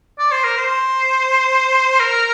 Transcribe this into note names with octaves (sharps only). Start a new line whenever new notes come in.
D5
C5
A#4
C5
A#4